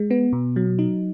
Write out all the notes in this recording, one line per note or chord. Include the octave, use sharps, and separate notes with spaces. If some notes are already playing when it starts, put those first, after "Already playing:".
Already playing: G#3
B3
B2
F#3
D#4